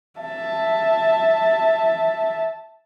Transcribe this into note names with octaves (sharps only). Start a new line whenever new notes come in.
E5 A5